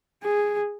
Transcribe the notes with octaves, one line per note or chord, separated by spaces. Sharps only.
G#4